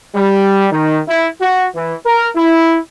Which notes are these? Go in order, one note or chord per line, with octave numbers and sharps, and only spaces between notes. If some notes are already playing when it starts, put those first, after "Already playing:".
G3
D#3
E4
F#4
E3
A#4
E4